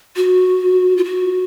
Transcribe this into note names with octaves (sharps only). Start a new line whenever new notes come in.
F#4
F4
F#4